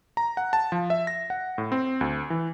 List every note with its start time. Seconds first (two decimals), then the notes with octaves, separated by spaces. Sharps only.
0.17 A#5
0.37 F#5
0.53 A5
0.72 F3
0.90 E5
1.07 A#6
1.30 F#5
1.58 A2
1.72 C4
2.01 D2
2.30 E3